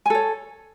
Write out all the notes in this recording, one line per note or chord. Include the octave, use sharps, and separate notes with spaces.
A4 C#5 G#5